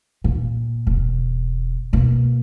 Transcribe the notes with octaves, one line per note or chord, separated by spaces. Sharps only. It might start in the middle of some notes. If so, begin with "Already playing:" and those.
A#2
E1
B2 A#3